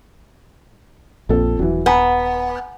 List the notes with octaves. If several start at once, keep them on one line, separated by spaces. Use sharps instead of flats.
A#1 F2 A#2 A4
D#1 E3 F#3
B3 G#5 A#5